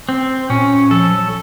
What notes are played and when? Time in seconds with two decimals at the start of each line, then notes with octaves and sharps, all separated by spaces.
0.09 C4
0.50 A#2 C#4
0.91 F3 A4
1.11 F#3